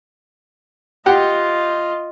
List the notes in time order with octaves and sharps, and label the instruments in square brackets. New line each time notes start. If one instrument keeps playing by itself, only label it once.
[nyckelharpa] F4 D#5 [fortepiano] G4 F#5 G5